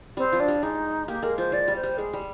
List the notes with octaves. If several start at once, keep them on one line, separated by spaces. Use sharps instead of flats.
G3 C4
F3
D4
G3
G#3 D#4
A#3 G4
G#3 A#4
F3 C5
F3 D5
G3
C5
G3
G#3 G#4
G3